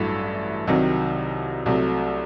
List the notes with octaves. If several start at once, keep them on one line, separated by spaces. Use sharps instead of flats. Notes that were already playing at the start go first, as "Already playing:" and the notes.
Already playing: A1 G2 F#3 A3 E4
C2 C3 D#3 F#3
C2 C3 F#3 A3